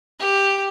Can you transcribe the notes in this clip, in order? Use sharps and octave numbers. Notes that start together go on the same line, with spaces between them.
G4